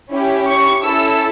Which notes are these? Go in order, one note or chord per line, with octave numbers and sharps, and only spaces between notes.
C#4 E4 G4
C#6
C#4 E4 A4 E6